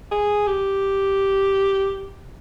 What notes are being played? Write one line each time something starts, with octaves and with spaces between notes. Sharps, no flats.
G#4
G4